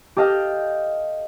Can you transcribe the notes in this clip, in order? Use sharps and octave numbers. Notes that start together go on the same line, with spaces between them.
G4 A4 D#5 F5 G5